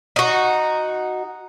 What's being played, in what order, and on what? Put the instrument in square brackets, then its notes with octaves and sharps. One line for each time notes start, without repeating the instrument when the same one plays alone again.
[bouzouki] D#4 F#4